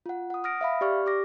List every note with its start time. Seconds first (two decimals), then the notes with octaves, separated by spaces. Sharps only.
0.06 F4 F#5
0.30 F#5 D#6
0.44 D#6 F6 A#6 D7
0.61 E5 F5 B5
0.81 G4 D5 C#6 F6
1.06 G4 D6 A#6